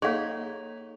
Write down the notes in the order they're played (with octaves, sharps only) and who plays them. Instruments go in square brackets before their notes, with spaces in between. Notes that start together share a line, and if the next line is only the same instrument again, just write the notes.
[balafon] A#3 A4 [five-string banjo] D#4 [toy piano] G#4 F5 [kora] C#5